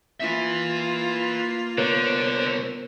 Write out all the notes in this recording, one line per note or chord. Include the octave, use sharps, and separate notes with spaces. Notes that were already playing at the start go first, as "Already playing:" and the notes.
A#3 F4 B4 E5
C2 D3 B3 A#4 C5 C#5